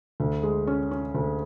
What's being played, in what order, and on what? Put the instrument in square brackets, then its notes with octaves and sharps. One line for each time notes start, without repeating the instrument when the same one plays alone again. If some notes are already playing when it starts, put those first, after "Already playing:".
[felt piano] D2
G#3
C#4
C#4
D2